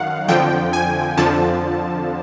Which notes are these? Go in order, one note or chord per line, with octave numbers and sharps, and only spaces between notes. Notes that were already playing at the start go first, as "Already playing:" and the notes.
Already playing: F#2 D#3 F5 F#5
F2 D3 F3 G5
G#5
F2 D3 F3 A5